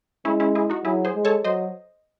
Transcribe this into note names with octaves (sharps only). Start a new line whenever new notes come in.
G#3 C#4 E4
C#4 E4
E4 G#4
D#4 F#4
F#3 E4 G#4
G#4 C5
G#3
A4 C#5
F#3 C5 D#5